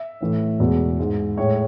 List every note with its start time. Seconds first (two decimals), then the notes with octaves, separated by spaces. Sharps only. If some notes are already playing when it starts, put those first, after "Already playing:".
Already playing: E5
0.21 A2 E3 A3
0.60 E2 B2 G#3
0.99 G#2 G#3
1.37 A2 G#3 C#5